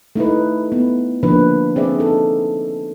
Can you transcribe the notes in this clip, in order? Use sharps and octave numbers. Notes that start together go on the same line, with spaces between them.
A3 D#4 E4 B4
B3
D3 F3 A#3 D4 B4
C4 G#4 D5 E5
D#4 A4